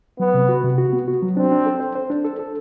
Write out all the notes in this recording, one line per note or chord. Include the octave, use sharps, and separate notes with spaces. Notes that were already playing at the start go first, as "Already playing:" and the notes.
F#3 B3
C3
F#4
C3
F#4
B3
F#4
F#3
C4 D4
D4
A4
C5
C5
D4
A4
A4